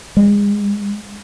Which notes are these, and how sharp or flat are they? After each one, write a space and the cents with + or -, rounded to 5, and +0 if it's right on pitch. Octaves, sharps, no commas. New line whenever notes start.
G#3 -30